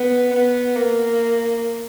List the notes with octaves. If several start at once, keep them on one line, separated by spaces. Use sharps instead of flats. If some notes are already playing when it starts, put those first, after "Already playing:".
Already playing: B3
B3
A#3